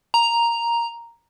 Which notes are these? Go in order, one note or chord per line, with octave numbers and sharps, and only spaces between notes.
A#5